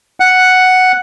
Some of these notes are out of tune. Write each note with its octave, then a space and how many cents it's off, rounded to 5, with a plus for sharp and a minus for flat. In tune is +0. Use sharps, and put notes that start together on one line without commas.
F#5 +0